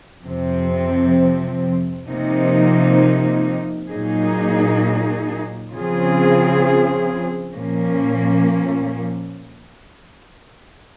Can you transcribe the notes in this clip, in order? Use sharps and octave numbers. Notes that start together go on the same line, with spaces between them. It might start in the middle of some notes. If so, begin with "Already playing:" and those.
F2 C3 F3 C4
C3 F3 A#3 D#4
A#2 F#3 A#3 D#4 G#4
C#3 F3 C4 F4 G#4
A#2 F3 A#3 C#4